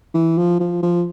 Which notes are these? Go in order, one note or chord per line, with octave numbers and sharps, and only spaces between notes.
E3
F3
F3
F3